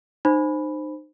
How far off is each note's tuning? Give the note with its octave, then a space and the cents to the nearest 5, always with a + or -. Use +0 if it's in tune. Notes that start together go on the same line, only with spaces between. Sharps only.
D#4 -35 C5 +0 B5 +0